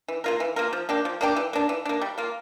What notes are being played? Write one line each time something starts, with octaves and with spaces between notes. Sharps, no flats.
E3
A#3 F4 A#4
E3
A#3 F4 A#4
F3
A#3 D4 G4
F3
A#3 D4 G4
E3
A#3 D4
E3
A#3 D4
G3
A#3 F4